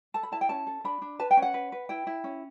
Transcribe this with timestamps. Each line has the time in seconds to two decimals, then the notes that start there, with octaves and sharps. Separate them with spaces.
0.14 A4 A5
0.23 B5
0.32 E4 A5
0.41 G5
0.49 C#4 A5
0.67 A4
0.84 D4 B5
1.02 D4
1.19 B4 A5
1.31 G5
1.37 C#4
1.42 F#5
1.54 B4
1.72 B4
1.89 E4 G5
2.07 E4
2.24 C#4